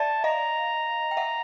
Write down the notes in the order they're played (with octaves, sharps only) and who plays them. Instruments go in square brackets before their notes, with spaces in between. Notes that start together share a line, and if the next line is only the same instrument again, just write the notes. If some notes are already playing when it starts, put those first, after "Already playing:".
Already playing: [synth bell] D5 E5 [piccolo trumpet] A5
[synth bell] D#5 F5 [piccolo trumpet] A#5
[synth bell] G5
E5 F#5